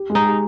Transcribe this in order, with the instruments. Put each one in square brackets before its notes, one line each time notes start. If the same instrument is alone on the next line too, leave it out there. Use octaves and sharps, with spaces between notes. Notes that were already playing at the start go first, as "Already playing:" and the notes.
Already playing: [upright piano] G4
G#3
[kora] D#4
[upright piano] G4